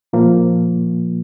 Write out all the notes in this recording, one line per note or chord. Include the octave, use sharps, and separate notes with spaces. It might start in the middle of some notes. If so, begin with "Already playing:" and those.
A#2 F3 A#3